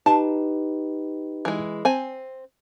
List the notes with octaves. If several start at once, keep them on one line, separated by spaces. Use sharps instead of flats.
D#4 G4 B4 A5
E3 G#3
C4 G#5